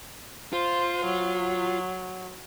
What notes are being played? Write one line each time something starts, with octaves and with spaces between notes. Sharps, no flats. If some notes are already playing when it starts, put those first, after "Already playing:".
F4 C5
F#3